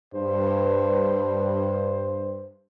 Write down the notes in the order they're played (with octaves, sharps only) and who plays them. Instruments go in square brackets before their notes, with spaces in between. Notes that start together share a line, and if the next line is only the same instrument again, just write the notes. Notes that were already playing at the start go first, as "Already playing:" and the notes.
[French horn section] G2 [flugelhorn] C5